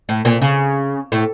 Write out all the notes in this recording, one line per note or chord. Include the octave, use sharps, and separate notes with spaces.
A2
A#2
C#3
A2